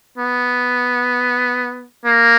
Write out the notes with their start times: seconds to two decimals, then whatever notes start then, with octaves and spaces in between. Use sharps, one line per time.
0.18 B3
2.05 A#3